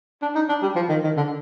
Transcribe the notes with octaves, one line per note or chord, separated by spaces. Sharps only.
D4
D#4
D4
G3
F3
D#3
D#3
D3